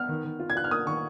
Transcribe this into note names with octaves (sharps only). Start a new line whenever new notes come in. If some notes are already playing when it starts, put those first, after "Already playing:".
Already playing: B3 F6
D#3
D#3
F4
G#6
F4 F#6
F6
A#3 D#6
D#3 C#6